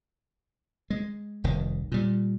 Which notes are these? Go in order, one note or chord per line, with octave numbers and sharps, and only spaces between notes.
G#3
F1 C2 D#3
A#2 G3